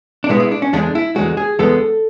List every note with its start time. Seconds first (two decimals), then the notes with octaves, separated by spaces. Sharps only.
0.24 D4
0.29 B2 G#3 B3 E4
0.40 E4
0.51 D4
0.62 C#4
0.73 E2 D3 G#3 D4
0.95 E4
1.16 E2 D3 G#3 F#4
1.37 G#4
1.59 E2 D3 G#3 B3 A4